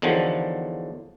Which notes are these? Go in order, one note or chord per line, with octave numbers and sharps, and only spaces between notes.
E2 D3 D#3 F3 F#3